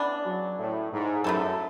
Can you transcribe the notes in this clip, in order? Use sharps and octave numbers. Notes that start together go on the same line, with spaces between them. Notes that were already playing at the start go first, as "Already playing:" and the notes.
Already playing: C#3 E3 B3 D4
F#3
A2
G#2
F#2 A3 E4 A4